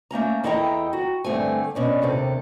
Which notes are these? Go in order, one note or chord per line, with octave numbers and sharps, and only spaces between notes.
A3 A#3 C#4 A#5
E2 E4 A4 D#5 G5 A#5
F#4
G2 D3 A3 C4 G#5
B2 C#4 D4
D#2 C3 A4